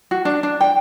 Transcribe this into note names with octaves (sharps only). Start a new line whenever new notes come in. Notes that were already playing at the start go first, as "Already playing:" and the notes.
F#4
D4
D4
G5